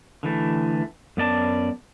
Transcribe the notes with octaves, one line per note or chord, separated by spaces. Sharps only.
D3 E3 A3
F#2 B3 D5 A5